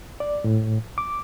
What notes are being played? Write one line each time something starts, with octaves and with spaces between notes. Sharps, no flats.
D5
A2
D6